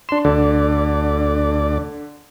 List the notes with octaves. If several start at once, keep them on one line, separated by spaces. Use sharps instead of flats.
D4 C6 E7
D2 D3 D5